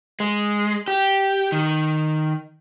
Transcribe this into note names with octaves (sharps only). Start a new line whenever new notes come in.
G#3
G4
D#3